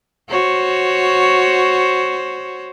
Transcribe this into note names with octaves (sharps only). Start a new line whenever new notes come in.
F#4 C5 C#5